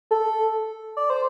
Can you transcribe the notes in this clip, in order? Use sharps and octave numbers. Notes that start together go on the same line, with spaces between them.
A4
D5
C5